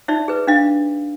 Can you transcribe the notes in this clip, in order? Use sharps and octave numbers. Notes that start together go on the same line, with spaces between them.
D#4 D5 E5
G#4 B4
D4 D#5 F5